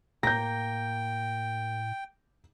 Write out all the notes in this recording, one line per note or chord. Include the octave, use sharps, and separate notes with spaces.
A2 A#3 G5 G6 A#6